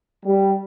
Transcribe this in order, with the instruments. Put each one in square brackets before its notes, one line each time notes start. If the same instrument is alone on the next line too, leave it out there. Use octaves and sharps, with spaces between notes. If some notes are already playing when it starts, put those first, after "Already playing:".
[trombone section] G3